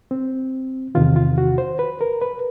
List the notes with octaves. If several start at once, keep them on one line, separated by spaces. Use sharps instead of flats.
C4
E2 C3 D#3 F4
F4
F#4
C5
B4
A#4
B4